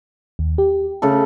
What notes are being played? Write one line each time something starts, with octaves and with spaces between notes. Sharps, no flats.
D#2
G4
C#3 A3 A4